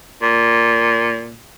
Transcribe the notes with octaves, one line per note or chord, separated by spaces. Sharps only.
A#2